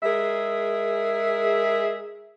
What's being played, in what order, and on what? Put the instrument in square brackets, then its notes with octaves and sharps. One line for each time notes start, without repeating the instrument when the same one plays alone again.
[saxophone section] G#3 G#4 A#4 E5